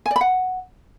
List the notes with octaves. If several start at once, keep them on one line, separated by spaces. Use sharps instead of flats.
G#5
D5
B5
F#5